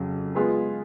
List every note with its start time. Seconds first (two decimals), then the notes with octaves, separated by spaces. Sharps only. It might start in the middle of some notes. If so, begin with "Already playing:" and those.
Already playing: F2 C#3 F#3
0.35 G#3 B3 F4 G#4 B4